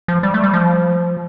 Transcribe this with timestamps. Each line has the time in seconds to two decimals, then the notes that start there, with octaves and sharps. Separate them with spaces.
0.08 F3
0.23 G3
0.34 A3
0.44 G3
0.53 F3